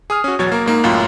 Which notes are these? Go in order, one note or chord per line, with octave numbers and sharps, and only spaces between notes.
G#4 D#6 F6
C#4 F#4
E2 B2 F#3 C#5 G#6 A6
A#3 A#4
G#2 A#3 D#4
C#2 F#2 A2 F4